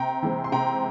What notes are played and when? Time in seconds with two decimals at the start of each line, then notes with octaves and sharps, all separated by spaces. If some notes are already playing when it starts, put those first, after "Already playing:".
Already playing: C3 G5 A#5
0.23 E3 G#3 C4
0.44 C6
0.52 C3 G5 A#5